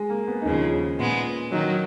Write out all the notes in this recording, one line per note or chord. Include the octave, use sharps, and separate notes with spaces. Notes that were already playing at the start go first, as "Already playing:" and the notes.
Already playing: G#3
A#3
B3
D#4
D#2 C#3 F3 C#4
A#2 G#3 B3
D#3 F#3 D#4